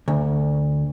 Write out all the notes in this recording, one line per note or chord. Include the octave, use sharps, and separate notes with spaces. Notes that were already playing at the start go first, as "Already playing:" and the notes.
D2